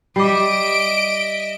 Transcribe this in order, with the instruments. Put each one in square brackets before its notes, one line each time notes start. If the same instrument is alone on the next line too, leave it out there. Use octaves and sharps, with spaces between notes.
[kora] G3 [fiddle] D#5 E5 [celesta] D6 C7 [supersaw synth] D7